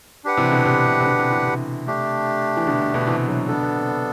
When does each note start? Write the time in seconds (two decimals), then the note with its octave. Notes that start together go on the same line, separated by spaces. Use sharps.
0.25 D4 G4 B4 F#5
0.37 C3 E3
0.51 B2 D3
0.65 C3
0.86 C3
1.00 C3
1.06 B2 D3
1.18 C3 E3
1.32 C3 E3
1.46 C3
1.87 A3 D4 G4
2.57 E3
2.67 B2 D3
2.81 B2
2.94 B2 D3
3.07 C3 E3
3.28 D3 F#3
3.48 B2 D3 B3 D4 A4
3.62 B2
3.75 C3